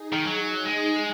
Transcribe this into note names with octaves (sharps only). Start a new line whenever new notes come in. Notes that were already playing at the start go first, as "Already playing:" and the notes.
Already playing: D#4 G#4
D#3
F#3
G#3 D#4 G#4